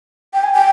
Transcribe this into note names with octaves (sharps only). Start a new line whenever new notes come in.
G5
G#5
G5